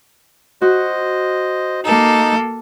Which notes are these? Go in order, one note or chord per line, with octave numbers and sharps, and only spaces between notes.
F#4 C5 D#5
A#3 D#4 A4